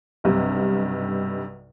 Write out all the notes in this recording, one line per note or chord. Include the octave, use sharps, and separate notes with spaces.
B1 G2 C3